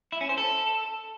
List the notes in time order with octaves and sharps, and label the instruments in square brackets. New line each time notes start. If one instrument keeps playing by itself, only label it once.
[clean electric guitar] E4
C#4
C5
A4